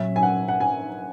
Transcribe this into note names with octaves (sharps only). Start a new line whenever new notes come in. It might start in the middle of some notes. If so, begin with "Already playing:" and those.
Already playing: A#2 F#3 C#4 E5
G#5
F#5
F#5
G#5